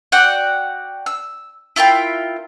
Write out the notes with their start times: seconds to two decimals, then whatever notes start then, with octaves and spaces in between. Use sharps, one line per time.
0.12 F#4 D5 F#5 G5
1.06 E6
1.76 E4 F4 A#4 G5